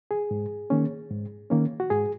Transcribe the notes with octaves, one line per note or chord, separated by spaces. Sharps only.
G#4
G#2
D#3 A#3 C#4
G#2
D#3 A#3 C#4
F#4
G#2 G#4